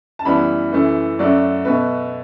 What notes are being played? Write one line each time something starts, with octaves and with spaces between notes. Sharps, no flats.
A5
F#2 E3 G3 B3 B5
F#2 E3 A3
F#2 F#3 A3 D5
B2 A3 B4